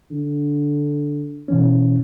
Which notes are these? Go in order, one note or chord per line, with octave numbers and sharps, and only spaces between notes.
D3
B2 E3 C#4